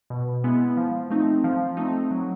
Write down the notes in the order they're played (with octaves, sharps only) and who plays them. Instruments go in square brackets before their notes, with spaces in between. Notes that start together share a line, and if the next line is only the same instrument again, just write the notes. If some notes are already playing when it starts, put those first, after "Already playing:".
[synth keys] B2
G#3 B3 E4
F3
A3 C4 D#4
F3
A3 C4 D#4
F#3